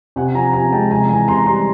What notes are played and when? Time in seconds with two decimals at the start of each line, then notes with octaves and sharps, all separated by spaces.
0.16 C3 F#5 G#5
0.35 F3 G#5 A#5
0.53 C3 G#5 A#5
0.72 G#3 G5 A5
0.90 C3 G#5 A#5
1.09 E3 G#5 A#5
1.28 C3 A#5 C6
1.46 G3 A#5 C6